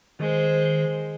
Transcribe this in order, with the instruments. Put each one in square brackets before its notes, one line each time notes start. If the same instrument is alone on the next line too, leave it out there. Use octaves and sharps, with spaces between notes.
[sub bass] D#3 [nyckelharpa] G#3 C5